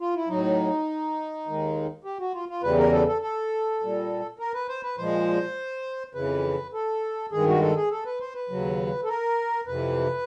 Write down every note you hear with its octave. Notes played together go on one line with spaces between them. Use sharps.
F4
E4
A2 F#3 D#4
D#2 D#3 G#3
G4
F#4
F4
F4
E2 C#3 E3 G3 B4
A#4
A4
A4
A4
A#2 G3
A#4
B4
C5
B4
A#2 F3 G#3 C5
F2 C#3 E3 B4
A4
G2 D#3 G#3 G#4
F#4
A4
G#4
A4
B4
C5
B4
D#2 C#3 F#3
A4
A#4
F2 C3 E3 B4